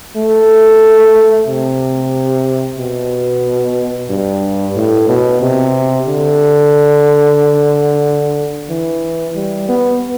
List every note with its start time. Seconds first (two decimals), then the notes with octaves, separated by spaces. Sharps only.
0.16 A3
1.48 C3
2.78 B2
4.10 G2
4.76 A2
5.09 B2
5.42 C3
6.07 D3
8.69 E3
9.35 G3
9.68 B3